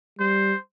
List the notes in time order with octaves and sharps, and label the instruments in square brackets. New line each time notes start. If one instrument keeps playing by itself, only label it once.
[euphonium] G3 [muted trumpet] C5